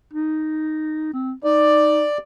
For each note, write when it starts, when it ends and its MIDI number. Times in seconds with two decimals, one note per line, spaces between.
0.14 1.11 63
1.13 1.33 60
1.44 2.05 63
1.44 2.18 74